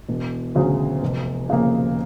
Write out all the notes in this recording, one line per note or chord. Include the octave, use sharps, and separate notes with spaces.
E1
D2 C#3 F#3
F1
F2 C#3 F3 A#3